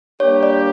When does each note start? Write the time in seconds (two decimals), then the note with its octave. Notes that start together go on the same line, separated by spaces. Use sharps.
0.20 G3 A#3 D4 G4 C#5
0.43 D5